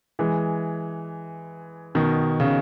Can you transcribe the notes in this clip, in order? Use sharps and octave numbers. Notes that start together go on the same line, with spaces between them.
E3 G#3
B2 D#3
C#3